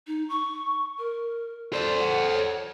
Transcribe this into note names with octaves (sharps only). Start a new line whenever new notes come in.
D#4
C#6
A#4
A4 C5 D5
F#5
C#5